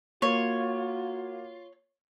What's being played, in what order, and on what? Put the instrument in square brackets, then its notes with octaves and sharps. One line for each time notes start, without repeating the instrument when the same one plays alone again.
[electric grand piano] A#3 [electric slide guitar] F4 [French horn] F#4 [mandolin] C#5